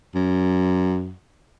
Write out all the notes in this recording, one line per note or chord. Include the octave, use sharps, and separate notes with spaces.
F#2